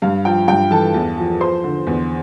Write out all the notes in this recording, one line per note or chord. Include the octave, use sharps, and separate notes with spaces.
G2 F5
F3 G5
G2 G5
E3 A4 A5
E2
F3
F3 C5 C6
D3
E2